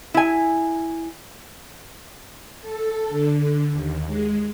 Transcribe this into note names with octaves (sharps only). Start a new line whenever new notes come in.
E4 G#5
A4
D3
D#2
G#3